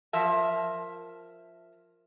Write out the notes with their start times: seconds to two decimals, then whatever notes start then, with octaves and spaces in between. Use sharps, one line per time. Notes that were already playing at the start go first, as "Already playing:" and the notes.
0.13 F3 A#4 E5 A5